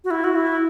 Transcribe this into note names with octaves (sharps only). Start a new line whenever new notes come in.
F#4
E4
F#4
E4